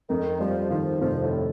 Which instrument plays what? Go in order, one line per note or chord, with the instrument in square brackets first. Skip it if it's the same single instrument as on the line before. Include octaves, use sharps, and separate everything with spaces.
[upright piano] F2 [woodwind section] D#3
[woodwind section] F3 [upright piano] G3
[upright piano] D#3 [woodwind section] F3
[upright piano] F1 [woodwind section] F3
[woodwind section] A2